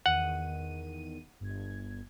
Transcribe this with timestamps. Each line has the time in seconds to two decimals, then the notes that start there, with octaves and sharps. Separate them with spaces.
0.06 E2 D#3 F#5 D#7
1.40 G1 G#6